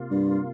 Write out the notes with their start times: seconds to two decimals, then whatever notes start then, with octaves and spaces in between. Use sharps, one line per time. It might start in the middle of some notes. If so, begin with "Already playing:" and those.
Already playing: C3 A#3 F4
0.11 G2